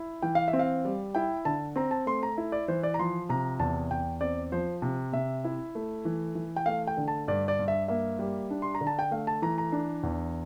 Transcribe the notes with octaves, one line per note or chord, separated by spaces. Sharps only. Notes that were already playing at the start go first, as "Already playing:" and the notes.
Already playing: E4
E3 G5
F5
E5
C4
F5
G3
E4 G5
D3 A5
C4 A#5
A5
A3 C6
A#5
E4
D5
E3 C5
D5
A#5
F3 C6
C3 A#5
E2 A5
E2 G5
C4 D5
F3 C5
C3
C3 E5
E4
A3
E3
E3
G5
A3 F5
G5
D3
A5
G2 D5
D5
G2
E5
A#3 E5
G3
D4
C6
A#5
D3
A5
G5
A3 F5
A5
E3 A#5
A#5
D4
E2